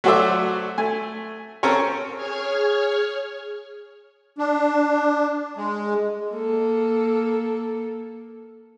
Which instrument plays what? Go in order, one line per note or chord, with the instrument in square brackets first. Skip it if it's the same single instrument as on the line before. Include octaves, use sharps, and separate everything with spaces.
[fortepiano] F#3 A3 F#4 C5 D5 E5
A3 G#5
C4 C#4 A4 A#4 C#5
[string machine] G#4 C#5 F6 G#6
[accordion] D4
G#3
[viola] A#3 A4